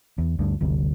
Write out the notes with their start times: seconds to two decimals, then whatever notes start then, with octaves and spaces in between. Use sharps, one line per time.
0.18 E2
0.39 D2 G2
0.61 G1 D2 G2 C3